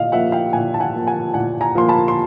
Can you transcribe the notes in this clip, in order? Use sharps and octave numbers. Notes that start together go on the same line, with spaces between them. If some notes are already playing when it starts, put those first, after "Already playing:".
Already playing: A#2 D#5 F5
F3 A#3 E5 F#5
F5 G5
A#2 F#5 G#5
A5
F#5 G#5
F3 A#3
F#5 G#5
A#2 F#5 G#5
G#5 A#5
F3 A#3 C6
A5 B5
C6